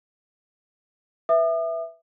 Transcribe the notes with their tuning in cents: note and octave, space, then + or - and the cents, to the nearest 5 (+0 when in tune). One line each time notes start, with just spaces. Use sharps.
B4 +0 E5 +0 D#6 -45